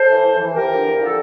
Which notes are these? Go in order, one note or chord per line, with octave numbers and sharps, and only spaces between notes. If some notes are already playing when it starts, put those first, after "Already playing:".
Already playing: A4 C5
E3
E2
E3
E2 G4 A#4
D3 F3
E2
D3 F3 A4